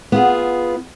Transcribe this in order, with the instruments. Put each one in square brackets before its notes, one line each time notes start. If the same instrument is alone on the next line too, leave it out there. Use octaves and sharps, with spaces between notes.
[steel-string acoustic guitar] B3 F4 G#4